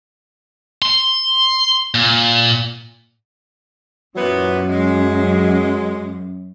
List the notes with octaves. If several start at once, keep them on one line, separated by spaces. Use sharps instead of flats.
C6
A#2
F#2 A#2 E3 F#3 B3
G#3